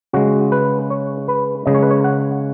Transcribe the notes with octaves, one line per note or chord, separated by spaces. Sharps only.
C#3 G#3 F#4
B4
C#5
B4
C#3 G#3 D#5
C#5
B4
C#5
F#5